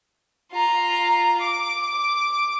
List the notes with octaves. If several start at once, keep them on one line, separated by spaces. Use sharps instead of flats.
F4 A#5
D6